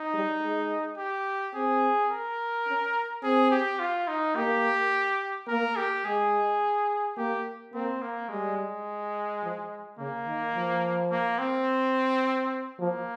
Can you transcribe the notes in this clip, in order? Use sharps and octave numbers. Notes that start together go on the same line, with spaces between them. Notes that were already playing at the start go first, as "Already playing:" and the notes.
Already playing: D#4
G3
G#3
G4
C4 G#4
A#4
C#4
C4 G#4
G4
F4
D#4
A#3 G4
A#3 A#4
G4
G#3 G#4
A#3 G4
A#3 C4
A#3
G3 G#3
G#3
F3
C#3 A#3
D#3
F3
A#3
C4
F3 A#3